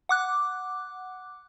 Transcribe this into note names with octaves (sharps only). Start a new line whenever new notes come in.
F#5 D6 F#6